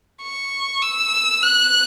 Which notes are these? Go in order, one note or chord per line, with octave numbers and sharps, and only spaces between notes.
C#6
E6
F#6